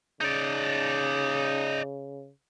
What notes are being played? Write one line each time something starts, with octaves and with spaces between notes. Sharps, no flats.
C#3 D#4 D5